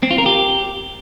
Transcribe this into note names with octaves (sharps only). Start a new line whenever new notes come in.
C4
F4
A#4
G4